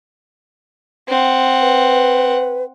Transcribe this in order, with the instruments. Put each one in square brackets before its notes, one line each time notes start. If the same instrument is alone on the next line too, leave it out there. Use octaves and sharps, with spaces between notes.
[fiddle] C4 F#5
[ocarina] B4